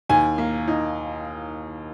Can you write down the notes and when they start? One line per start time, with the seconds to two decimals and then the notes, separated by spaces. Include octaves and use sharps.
0.09 D#2 G#5
0.38 A#3
0.68 D#4